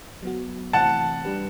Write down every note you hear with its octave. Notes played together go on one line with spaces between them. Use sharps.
F#3 B3 F#4
C3 E3 A3 C4 F#5 A5
G3 D4 G4 B4